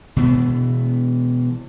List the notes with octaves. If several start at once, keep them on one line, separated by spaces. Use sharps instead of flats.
B2 E3 B3